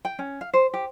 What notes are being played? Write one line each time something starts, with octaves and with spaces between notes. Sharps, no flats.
G5
C#4
F5
C5
G4